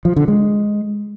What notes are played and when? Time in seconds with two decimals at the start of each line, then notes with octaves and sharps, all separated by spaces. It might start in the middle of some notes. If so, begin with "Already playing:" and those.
0.05 F3
0.16 D3
0.28 G#3